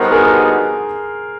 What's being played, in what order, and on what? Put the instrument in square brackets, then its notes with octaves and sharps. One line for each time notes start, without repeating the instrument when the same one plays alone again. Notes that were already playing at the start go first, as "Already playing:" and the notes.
Already playing: [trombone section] D3 G3 B3 D#4 F#4 [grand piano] A#4 C5
[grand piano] G#4 A#4